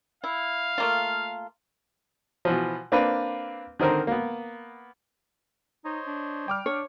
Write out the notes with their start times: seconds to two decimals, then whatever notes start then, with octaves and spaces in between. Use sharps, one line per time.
0.24 E4 F5
0.78 A3 A#3 F4
2.45 B2 E3 F3
2.92 A#3 C4 D4 F4 B4
3.79 D3 D#3 C4 A#4 C5
4.07 A#3 B3
5.85 D#4 C5 C#5 D#5
6.07 D4
6.48 G3 G5 D6 F6
6.66 D4 C#5